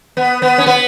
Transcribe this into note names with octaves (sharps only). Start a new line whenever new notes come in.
B3
B3
C#4
B3